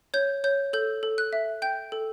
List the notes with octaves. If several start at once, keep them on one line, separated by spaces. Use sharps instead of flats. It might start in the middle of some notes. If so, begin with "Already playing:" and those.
C#5 G6
C#5 G6
A4 G6
A4
F#6
E5
G5 G6
A4